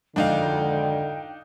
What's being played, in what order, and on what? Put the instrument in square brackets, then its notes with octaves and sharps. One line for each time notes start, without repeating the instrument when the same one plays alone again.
[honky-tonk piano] G#1 F2 G#2 [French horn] D3 [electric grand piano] D4 D#4 F5 [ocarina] G5